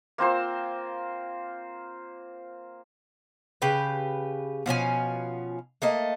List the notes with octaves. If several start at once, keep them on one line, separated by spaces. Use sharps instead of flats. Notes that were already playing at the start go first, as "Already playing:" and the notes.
A#3 C4 F4 C5
C#3 G4 B4
B2 F3 C#4 G#5
A3 A#3 D#5